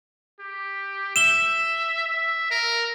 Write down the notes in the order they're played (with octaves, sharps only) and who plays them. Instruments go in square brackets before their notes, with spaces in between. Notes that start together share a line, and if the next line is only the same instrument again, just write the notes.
[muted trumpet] G4
[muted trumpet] E5 [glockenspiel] E7 G7
[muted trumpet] E5
A#4